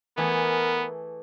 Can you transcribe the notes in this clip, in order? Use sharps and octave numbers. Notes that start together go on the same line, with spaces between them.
E3 A3 B3 G#4 A#4